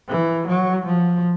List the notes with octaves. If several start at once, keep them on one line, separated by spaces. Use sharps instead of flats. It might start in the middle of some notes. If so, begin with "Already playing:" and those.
E3
F#3
F3